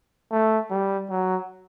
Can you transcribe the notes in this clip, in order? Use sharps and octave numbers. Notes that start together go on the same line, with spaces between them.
A3
G3
F#3